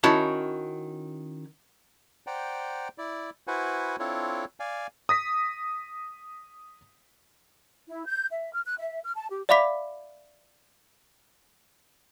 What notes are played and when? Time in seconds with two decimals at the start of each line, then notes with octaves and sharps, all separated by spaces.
0.04 D#3 C#4 E4 F#4 A5
2.27 C5 D5 F#5 G5 A#5
2.98 E4 D5
3.47 E4 F#4 B4 C5 F#5 G#5
3.99 C4 D4 E4 F4 A4 C#5
4.60 D5 F5 G#5
5.09 D#6 A#6 B6
7.87 E4
8.06 G6
8.29 E5
8.52 F6
8.65 F#6
8.78 E5
9.03 F6
9.16 A5
9.30 G4
9.49 D5 E5 F5 B5 D6 B6